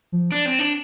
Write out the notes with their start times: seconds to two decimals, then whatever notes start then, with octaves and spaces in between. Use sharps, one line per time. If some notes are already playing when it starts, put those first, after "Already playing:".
0.12 F3
0.32 D4
0.45 C4
0.59 D4